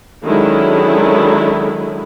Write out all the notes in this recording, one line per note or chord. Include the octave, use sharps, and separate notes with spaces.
D3 D#3 F#3 G#3 C#4 E4